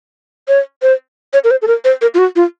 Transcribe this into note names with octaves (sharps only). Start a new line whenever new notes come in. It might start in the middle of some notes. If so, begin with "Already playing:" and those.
C#5
C5
C#5
A#4
C5
A4
A#4
C5
A#4
F4
F#4
F4